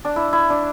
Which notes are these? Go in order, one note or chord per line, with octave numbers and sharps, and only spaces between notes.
D4
E4
E4
D4